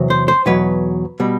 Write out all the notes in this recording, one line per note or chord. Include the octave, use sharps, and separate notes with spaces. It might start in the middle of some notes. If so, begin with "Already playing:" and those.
Already playing: E2 C3 F#3
C5
C5
E2 B2 F#3 B4
B2 G3